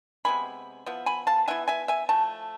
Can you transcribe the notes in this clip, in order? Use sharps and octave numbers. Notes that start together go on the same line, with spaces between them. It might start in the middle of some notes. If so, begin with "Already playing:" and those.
C3 G#3 B3 G#5 B5
F3 B3 E4
G#5 B5
F5 A5
E3 B3 E4 E5 G#5
E5 G#5
E5 G#5
F3 A3 A5